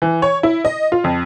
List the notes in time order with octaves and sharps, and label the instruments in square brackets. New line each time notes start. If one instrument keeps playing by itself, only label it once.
[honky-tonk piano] E3
C#5
E4
D#5
F4
F2